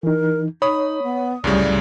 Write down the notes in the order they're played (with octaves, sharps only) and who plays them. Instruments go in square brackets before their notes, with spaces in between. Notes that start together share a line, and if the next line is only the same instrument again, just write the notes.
[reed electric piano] E3 D#4 [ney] A#4
[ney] D#4 [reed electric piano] C#5 [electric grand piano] B5 D#6
[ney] B3
[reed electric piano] C2 G3 [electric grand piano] F#2 A2 C#3 [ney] D5